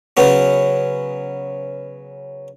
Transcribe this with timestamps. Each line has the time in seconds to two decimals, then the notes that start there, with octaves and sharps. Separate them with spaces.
0.17 C#3 F#3 B3 C#4